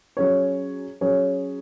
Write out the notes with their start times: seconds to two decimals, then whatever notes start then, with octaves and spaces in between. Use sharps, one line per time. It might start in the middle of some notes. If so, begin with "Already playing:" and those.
0.17 F#3 C#4 G#4 C#5
1.01 F#3 C#4 G#4 C#5